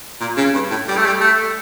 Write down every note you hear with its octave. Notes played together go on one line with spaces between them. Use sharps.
A#2
C#3
G2
A2
G3
A3
G3
A3